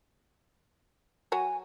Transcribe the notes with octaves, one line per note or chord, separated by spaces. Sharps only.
F#3 F#4 C#5 G#5